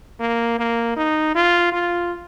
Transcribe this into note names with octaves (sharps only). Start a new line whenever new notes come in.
A#3
A#3
D#4
F4
F4